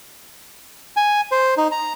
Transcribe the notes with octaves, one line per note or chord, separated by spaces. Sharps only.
G#5
C5
D#4
A#5